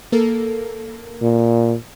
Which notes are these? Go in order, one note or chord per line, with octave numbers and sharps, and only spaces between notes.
A#3 A4 A#4
A#2